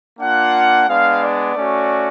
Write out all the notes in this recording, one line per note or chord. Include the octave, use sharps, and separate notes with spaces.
A#3 D4 F4 F#5
G#3 B3 D4 F5
D5
A3 C#4 F#4